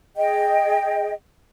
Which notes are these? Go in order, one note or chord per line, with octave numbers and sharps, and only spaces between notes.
G#4 D#5 G5